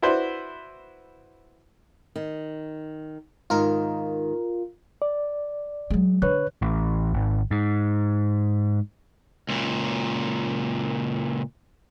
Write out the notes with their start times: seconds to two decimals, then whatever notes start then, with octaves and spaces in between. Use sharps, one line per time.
0.02 E4 F#4 B4 C5 D5
2.16 D#3
3.50 G#2 D#3 F4 A#4
5.02 D5
5.90 F#3 G#3
6.22 D3 B4 C#5 F#6
6.62 A1
7.14 G#1
7.51 G#2
9.49 C#2 A#2